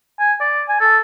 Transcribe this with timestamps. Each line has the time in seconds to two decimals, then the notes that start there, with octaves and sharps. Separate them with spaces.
0.19 G#5
0.40 D5
0.69 G#5
0.80 A4